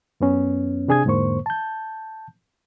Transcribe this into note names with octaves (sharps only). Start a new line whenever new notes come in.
F#2 B3 C#4
C3 D4 G#4 G#5 D#6 G#6
E2 G#2 D3 A#3 C5 C#6
A5 G6